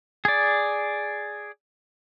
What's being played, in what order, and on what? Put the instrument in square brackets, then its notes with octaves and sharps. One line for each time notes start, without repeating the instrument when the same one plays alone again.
[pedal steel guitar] G#4 D5